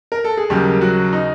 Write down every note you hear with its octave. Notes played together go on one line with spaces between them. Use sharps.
A#4
A4
G#4
D#2 C#3 F#3 G3 A#3 G4
F#3 F#4
D#4